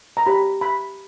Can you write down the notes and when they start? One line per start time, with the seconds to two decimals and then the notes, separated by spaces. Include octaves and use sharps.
0.17 A#5
0.26 G4 C#5 B5
0.61 B5